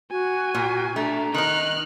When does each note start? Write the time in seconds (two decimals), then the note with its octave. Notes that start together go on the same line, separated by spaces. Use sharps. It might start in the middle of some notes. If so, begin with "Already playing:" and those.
0.11 F#4 G#5
0.55 A#2
0.96 A3 D4 A#5
1.34 D#3 D#4 F6 F#6